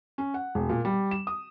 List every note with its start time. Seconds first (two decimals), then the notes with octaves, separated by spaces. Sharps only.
0.18 C#4
0.34 F#5
0.55 E1
0.69 A#2
0.85 G3
1.11 E7
1.27 D#6